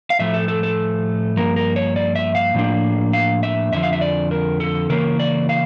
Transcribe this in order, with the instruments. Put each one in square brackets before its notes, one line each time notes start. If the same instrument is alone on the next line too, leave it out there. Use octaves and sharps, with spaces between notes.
[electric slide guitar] F5
A2 F3 A3 E5
A4
A4
A4
G2 F3 A#3 A#4
A#4
C#5
D5
E5
F5
A2 F3 A#3 D4
F5
E5
F2 D3 F3 E5
F5
E5
D5
A#4
A4
C#3 E3 A#3 C#4 A#4
D5
F5